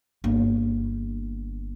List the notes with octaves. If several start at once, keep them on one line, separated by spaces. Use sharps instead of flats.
G1 A#3